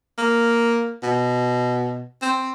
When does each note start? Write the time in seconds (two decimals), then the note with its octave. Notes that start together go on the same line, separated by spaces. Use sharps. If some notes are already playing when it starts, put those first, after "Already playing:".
0.18 A#3
1.03 B2
2.22 C4